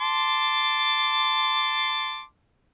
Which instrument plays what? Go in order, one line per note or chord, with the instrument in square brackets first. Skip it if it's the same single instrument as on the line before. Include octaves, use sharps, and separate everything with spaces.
[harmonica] A5 C6 D6